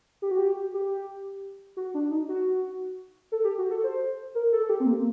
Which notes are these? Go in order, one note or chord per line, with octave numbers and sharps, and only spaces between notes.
G4
F#4
G4
G4
F#4
D4
D#4
F#4
A4
G4
F#4
A4
C5
A#4
A4
A4
G4
C4
A#3